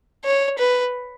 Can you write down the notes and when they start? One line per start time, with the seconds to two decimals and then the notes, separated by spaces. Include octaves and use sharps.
0.25 C#5
0.59 B4